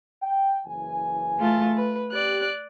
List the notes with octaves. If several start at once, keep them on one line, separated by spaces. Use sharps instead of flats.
G5
F#1 E3 G#5
A3 F4 A5
B4
G4 D5 F#6